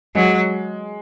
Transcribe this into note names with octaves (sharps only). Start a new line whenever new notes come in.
F#3 G#3